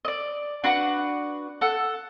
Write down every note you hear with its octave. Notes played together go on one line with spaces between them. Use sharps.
D5 D#5
D4 F#4 B4 F#5
A4 F#5